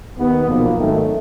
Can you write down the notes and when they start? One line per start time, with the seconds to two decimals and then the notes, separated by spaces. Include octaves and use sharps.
0.17 D#2 D#3 B3
0.47 B1 A#2 F3 A#3
0.77 G#1 F#2 D#3 A3